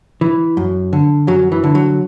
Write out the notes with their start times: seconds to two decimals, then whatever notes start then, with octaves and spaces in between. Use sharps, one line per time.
0.21 E3
0.57 F#2
0.93 D3
1.27 F#2 F#3
1.52 E3
1.64 D3
1.75 F#3